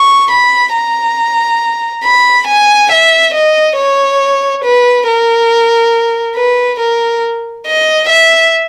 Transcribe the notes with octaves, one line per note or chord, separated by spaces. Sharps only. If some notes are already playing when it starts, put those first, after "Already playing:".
Already playing: C#6
B5
A#5
B5
G#5
E5
D#5
C#5
B4
A#4
B4
A#4
D#5
E5